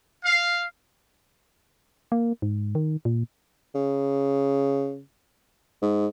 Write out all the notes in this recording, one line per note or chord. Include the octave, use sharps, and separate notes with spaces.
F5
A#3
G#2
D#3
A#2
C#3
G#2